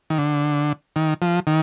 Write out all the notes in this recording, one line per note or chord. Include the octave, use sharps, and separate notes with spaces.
D#3
D3
D#3
F3
D#3